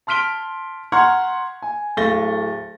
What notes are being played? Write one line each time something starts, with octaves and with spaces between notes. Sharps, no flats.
A5 C6 F6 B6 D7 G7
F#5 A#5 C6 C#6 F6 G#6
G#5
D1 A3 F5 A6 A#6 G7